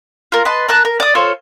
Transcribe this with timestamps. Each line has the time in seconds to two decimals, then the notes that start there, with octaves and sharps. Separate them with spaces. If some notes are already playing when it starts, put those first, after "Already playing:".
0.32 F4 A#4
0.45 B4 D#5 A5 C6
0.68 A#4 A5 F#6
0.85 A#4
1.00 D5 D#6
1.15 F4 A4 C5 C#5